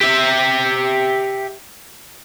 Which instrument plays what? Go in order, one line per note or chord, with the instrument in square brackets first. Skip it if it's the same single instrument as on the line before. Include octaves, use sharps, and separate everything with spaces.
[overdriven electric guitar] G4 E5